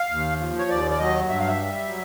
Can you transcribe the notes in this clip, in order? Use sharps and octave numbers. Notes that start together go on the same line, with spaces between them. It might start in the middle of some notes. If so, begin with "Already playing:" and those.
Already playing: F5
D#2
F3
C#5
D#2 D5
D5
F#3 D#5
G2 E5
F5
E5
G3
F#3